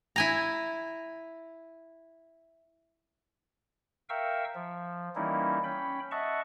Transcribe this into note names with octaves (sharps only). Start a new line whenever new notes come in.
E4 G#5 A#5
A#4 E5 F5 G5 C#6 E6
F3
E3 G3 A#3 C#4 D#4 E4
C#4 G5 B5
D#5 E5 F#5 A5 C#6